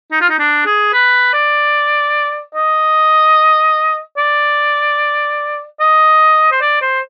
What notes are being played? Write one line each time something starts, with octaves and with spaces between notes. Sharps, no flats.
D#4
F4
D#4
D4
G#4
B4
D5
D#5
D5
D#5
C5
D5
C5